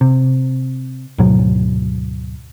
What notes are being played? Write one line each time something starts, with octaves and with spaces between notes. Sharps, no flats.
C3
D2 G#2 B2 F#3